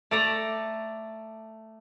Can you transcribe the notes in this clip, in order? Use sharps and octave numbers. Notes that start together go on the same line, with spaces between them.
A3 D5 A#5